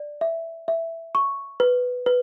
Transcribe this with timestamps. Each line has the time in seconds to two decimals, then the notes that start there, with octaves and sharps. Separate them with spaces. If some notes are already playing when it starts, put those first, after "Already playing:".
Already playing: D5
0.21 E5
0.68 E5
1.15 C#6
1.60 B4
2.06 B4